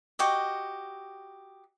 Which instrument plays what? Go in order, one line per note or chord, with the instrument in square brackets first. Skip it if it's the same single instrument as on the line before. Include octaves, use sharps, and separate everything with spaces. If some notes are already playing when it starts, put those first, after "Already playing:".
[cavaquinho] F#4 G4 D#5